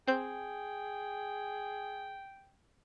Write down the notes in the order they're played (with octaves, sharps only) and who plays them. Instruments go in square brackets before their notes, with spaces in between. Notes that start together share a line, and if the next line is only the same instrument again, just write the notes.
[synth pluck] C4 G6 [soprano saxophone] G#4 [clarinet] G5